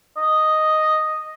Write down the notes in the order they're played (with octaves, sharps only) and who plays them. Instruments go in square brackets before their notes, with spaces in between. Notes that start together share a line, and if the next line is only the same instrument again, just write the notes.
[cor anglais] D#5